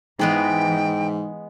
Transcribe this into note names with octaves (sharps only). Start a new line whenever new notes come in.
G#2 E3 G#3 B3 G#4 G5